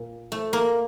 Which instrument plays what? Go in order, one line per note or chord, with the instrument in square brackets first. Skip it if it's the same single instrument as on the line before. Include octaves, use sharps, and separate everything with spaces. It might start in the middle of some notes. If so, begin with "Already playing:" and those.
Already playing: [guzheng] A#2
A3
A#3